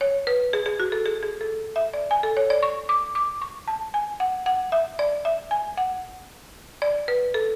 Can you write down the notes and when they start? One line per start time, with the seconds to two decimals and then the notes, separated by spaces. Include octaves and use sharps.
0.01 C#5
0.27 B4
0.53 G#4
0.66 G#4
0.80 F#4
0.92 A4
1.06 G#4
1.23 G#4
1.41 A4
1.76 E5
1.94 D5
2.11 G#5
2.23 A4
2.37 C#5
2.50 D5
2.63 C#6
2.89 D6
3.15 D6
3.42 C#6
3.68 A5
3.94 G#5
4.20 F#5
4.46 F#5
4.72 E5
4.99 D5
5.25 E5
5.51 G#5
5.77 F#5
6.82 D5
7.08 B4
7.34 A4